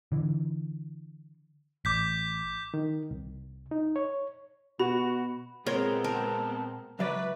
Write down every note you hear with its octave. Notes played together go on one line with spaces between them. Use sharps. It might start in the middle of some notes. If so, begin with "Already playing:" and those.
D3 E3
A1 D6 G6 B6
D#3
C2
D#4
C#5
B2 F#4 B5
A#2 G#3 B3 C4 A#4 C#5 C6
A#4 A5
C#2 F#3 B4 D5 E5